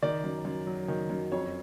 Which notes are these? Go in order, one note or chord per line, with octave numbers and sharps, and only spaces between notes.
D#3 D5
F#2
F#2
F#3
D#3
F#2
F2 C#5